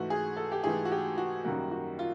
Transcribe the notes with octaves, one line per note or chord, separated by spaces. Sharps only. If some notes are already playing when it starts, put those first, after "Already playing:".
Already playing: G#2 E3 A3 F#4
G#4
A4
G4
G#2 E3 A3 G#4
F#4
G4
F#4
F#2 D#3 G3 A#3 F#4
F#4
F4